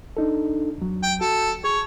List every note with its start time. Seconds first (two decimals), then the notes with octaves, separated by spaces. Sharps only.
0.17 D4 D#4 A4
0.78 E2 F#3
1.03 G5
1.21 F#4 A4
1.64 G#4 C#5